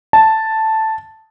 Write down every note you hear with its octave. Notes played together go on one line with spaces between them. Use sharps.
A5